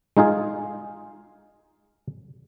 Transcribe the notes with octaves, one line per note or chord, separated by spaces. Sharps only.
G#3 D#4 F4 G#4